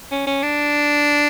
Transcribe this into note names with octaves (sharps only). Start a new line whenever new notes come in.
C#4
C#4
D4